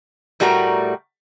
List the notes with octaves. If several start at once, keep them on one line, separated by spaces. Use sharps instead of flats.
A2 G3 A3 F#4 A#4 A#5